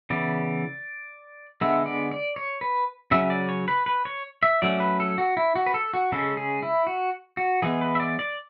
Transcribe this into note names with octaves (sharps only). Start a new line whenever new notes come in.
C#3 E3 B3 D5
D3 G#3 B3 E5
D5
D5
C#5
B4
C#3 F#3 C#4 E5
D5
C#5
B4
B4
C#5
E5
F#3 A3 C#4 D5
B4
A4
F#4
E4
F#4
B4
A4
F#4
C#3 G#3 C#4 A4
G#4
E4
F#4
F#4
E3 G#3 B3 G#4
B4
E5
D5
D5